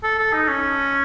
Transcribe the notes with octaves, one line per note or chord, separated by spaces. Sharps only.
A4
A4
D#4
C#4